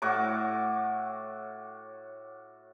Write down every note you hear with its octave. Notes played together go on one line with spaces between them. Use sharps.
A2 F#4 C#6 D6